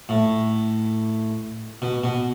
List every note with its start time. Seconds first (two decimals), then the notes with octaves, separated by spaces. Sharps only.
0.09 A2
1.82 B2
2.04 B2